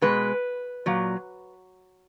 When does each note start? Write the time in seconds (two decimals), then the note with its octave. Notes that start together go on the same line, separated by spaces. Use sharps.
0.02 B2 G#3 B4
0.86 A#2 F#3